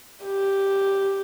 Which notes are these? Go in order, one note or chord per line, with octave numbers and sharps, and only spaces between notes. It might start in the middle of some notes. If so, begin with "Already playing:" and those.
G4